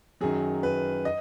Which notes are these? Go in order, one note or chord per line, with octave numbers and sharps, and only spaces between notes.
F#2 D#3 F#3 G#4
B4
D#5